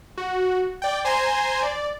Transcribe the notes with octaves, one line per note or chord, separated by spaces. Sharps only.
F#4
D5 G5
C5 G#5 A#5 C6
D5